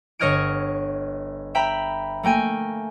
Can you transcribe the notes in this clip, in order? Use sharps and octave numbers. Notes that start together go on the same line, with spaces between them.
G1 C#5 D#5 F6 G#6 D7
E5 G5 A#5 B5
A3 A#3 G5 G#5